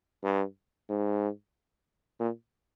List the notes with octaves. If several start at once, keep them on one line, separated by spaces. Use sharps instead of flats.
G2
G#2
A#2